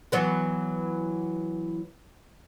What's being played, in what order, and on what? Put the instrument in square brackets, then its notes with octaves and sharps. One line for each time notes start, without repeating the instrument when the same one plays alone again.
[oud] E3 F#3 B3